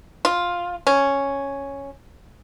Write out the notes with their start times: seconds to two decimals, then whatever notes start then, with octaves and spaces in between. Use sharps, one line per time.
0.25 F4
0.87 C#4